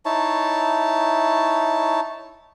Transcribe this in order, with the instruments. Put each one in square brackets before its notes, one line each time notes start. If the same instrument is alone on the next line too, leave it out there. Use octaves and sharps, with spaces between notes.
[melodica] D#4 E4 C#5 A5